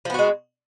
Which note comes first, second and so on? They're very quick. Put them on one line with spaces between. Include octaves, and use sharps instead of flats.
F3 B3 F#4 G#3